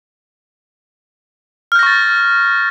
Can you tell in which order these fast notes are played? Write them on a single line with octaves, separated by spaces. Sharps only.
F6 G6 A#6 C#6 A6